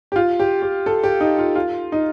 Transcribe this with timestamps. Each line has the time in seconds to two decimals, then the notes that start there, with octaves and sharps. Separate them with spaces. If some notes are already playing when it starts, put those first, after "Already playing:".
0.12 G4
0.16 F4
0.40 G4
0.62 G4
0.86 A4
1.03 G4
1.21 D#4
1.39 F4
1.55 F4
1.92 D#4